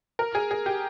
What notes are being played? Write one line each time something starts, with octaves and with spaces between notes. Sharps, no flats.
A#4
G#4
G#4
G4